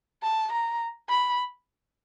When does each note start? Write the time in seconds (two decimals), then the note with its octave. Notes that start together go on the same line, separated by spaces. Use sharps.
0.23 A5
0.52 A#5
1.09 B5